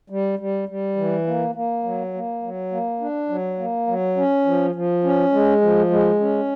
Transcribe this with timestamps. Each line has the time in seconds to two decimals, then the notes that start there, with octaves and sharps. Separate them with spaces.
0.10 G3
0.39 G3
0.69 G3
0.97 E3
1.27 A#3
1.55 A#3
1.84 F#3
2.14 A#3
2.43 F#3
2.71 A#3
3.01 D4
3.29 F#3
3.59 A#3
3.87 F#3
4.17 C#4
4.45 F3
4.75 F3
5.04 C#4
5.33 G#3
5.61 F3
5.91 G#3
6.20 C#4